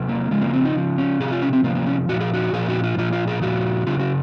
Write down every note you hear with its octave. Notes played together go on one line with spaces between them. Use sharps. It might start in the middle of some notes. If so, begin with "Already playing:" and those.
Already playing: C3 F#3
A#3
C#3 F3 G#3
A#3
C4
D#4
C#3 F3
C#4
C3 F3 G#4
F4
C#4
C4
C3 F3 A#3
A#3
C#4
A#2 F3 F#4
G#4
F#4
A#2 F3 G#4
F#4
F4
A#2 F3 F4
F4
G#4
A#2 F3 F#4
C#3 F#3 F4
F#4